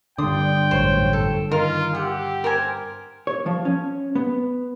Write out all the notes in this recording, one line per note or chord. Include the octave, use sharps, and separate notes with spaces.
G2 D3 D5 G5 C6 D#6
A1 F#2 C5 C#5
A4
D#3 F4 A#4
G4 F#5 E6
A#4 C5 G#5
C#5
F3
C#4
B3